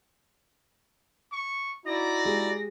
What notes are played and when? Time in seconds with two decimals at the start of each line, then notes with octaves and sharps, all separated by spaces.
1.32 C#6
1.86 D#4 E4 F#4 D5 A#6
2.25 G#3 G4 G#4